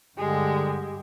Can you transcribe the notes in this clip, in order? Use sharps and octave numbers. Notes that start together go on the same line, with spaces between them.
G2 D3 G#3 G4